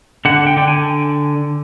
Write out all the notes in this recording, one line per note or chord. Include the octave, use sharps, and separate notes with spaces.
D3 F#5
G5
D3 G5
G#5